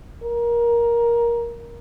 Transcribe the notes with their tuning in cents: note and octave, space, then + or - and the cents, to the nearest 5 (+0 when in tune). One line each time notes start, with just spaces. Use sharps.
A#4 +15